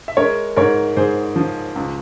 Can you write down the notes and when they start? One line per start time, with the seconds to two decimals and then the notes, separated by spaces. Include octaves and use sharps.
0.08 E5
0.17 G#3 A#4 C#5
0.56 G#2 A#4 C#5
0.97 G#2 G#4 C5
1.36 F3
1.76 C#2